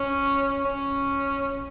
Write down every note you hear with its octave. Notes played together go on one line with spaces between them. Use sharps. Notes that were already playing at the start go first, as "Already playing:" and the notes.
Already playing: C#4
C#4